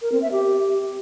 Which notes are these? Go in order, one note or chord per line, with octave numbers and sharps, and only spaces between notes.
A#4
C4
E5
G4